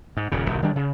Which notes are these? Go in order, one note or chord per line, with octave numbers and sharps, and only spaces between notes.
G#2
D#1 F#2 C#3
F#1 B1 D#3
D#3 G3 D4
C#3